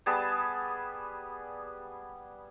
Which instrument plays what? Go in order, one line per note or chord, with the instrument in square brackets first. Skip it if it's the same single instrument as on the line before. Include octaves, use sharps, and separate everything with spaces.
[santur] G3 B3 G#4 A5